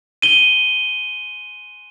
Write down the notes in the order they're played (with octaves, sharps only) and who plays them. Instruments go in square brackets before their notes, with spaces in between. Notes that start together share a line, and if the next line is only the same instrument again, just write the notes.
[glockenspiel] D#7 G7